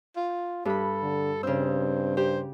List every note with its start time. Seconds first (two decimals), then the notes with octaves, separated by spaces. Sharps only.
0.16 F4
0.65 G2 A4 B5
1.02 D3
1.43 G2 C#3 C4 E6
2.17 G4 C5